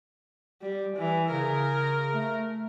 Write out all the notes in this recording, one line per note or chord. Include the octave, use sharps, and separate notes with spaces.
G3
E3
C#3 A#4
A3